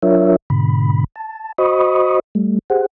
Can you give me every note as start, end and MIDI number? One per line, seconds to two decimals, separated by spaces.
0.03 0.36 54
0.03 0.36 62
0.03 0.36 65
0.03 0.36 70
0.03 0.36 73
0.03 0.36 76
0.50 1.04 44
0.50 1.04 47
0.50 1.04 50
0.50 1.04 83
1.16 1.52 81
1.58 2.19 66
1.58 2.19 72
1.58 2.19 75
1.58 2.19 83
1.58 2.19 85
1.58 2.19 87
2.35 2.59 55
2.35 2.59 57
2.70 2.86 67
2.70 2.86 68
2.70 2.86 72
2.70 2.86 78